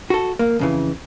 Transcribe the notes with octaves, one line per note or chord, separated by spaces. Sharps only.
F#4 A4
A#3
F2 C#3 E3